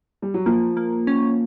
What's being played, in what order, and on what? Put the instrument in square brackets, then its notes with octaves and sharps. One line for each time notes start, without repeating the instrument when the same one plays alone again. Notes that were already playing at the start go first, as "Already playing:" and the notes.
[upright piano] G3
F#3
[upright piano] F3 [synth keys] A#3
[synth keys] A#3
C#4